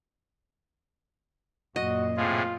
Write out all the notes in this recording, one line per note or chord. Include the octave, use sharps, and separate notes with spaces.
F#2 A#2 F#4 D#5
A2 C3 F4 G#4